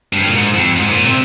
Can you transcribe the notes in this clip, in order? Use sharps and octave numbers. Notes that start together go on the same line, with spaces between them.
G2
A#2
G#2
F2
G#2
A#2
C3